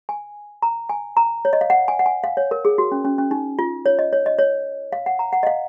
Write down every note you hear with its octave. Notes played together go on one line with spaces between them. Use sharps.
G#5
A#5
G#5
A#5
C#5
D#5
F5
F#5
G#5
F#5
G#5
F5
C#5
A#4
G#4
F#4
C#4
C#4
C#4
D#4
F4
C#5
D#5
C#5
D#5
C#5
F5
F#5
A#5
F#5
D#5
F5